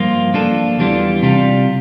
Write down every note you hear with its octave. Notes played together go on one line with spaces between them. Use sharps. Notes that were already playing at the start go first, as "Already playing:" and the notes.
Already playing: G2 F3 A#3 F4
F3 A#3 D4 F4 A4
E2 E3 G3 D4 F4
C3 G3 D4 F4